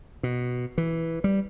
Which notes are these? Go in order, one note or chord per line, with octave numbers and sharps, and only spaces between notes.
B2
E3
G3